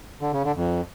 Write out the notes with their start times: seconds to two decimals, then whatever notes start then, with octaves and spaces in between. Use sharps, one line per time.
0.21 D3
0.33 C#3
0.44 D3
0.56 F2